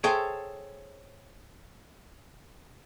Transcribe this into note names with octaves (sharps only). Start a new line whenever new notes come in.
G#4 A4 C5 C#5 E5 G5